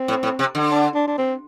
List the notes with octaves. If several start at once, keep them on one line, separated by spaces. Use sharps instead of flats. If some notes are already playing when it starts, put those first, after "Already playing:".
Already playing: C4
A2
A2
C3
D3
D4
D4
D4
C4